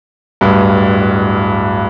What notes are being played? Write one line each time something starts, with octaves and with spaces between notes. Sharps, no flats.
D1 G2